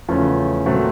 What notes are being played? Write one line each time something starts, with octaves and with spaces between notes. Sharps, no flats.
E2 C#3 F3 A3 C#4
A#2 F#3 A3 C4